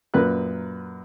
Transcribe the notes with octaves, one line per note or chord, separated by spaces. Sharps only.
F#2 A#2 A#4 B4 F#6